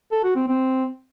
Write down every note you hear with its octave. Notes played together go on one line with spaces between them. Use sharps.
A4
F#4
C4
C4